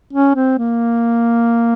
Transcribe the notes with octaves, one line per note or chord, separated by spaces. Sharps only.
C#4
C4
A#3